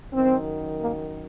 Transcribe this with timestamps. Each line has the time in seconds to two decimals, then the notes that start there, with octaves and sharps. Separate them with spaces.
0.13 F#2 D#3 C4
0.80 A#3